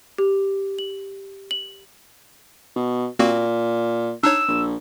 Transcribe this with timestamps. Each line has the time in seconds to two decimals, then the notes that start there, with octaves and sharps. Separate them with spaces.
0.18 G4
0.79 F#7
1.51 F#7
2.76 B2
3.19 A#2 A#3 C4 F#4
4.23 D4 D#4 C#5 E6
4.48 A#1